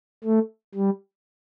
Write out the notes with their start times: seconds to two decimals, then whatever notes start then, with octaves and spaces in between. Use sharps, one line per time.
0.24 A3
0.75 G3